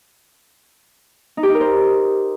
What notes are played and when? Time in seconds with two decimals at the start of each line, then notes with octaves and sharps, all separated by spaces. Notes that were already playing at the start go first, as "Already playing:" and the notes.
1.37 D#4
1.43 G4
1.49 D#4
1.55 A#4
1.61 C5